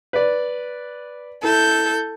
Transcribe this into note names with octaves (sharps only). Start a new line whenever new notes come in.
B4 D5
E4 A4 G6